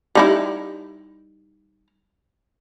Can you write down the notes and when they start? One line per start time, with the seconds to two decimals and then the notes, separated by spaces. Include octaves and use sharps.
0.15 G3 D#4 E4